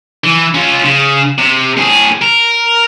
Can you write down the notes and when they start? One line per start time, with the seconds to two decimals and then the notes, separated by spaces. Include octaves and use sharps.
0.24 E3
0.55 C#4 F4
0.85 C#3
1.38 C3
1.78 A2 G#4
2.22 A#4